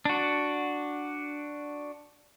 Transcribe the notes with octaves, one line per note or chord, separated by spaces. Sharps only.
D4 F#4